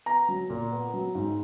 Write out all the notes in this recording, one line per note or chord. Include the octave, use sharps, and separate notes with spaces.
B3 A#5
F#3
A#2
B3
F#3
G#2